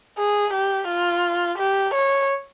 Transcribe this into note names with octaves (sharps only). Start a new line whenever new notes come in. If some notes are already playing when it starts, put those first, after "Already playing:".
G#4
G4
F4
G4
C#5